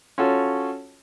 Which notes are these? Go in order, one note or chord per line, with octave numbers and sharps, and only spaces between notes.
C#4 F4 F#4 A4